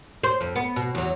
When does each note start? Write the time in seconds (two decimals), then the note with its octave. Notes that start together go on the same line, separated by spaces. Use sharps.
0.23 C5
0.41 F2
0.55 B3
0.76 B2
0.95 E2 F#3